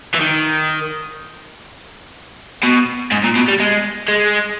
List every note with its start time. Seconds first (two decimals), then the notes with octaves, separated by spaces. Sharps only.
0.14 E3
0.20 D#3
2.63 B2
3.11 G#2
3.24 A#2
3.36 B2
3.48 G3
3.60 G#3
4.08 G#3